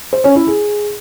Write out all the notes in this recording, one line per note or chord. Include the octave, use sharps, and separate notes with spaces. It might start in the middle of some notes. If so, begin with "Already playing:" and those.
C5
C#4
E4
G#4